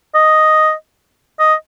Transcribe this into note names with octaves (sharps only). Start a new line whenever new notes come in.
D#5
D#5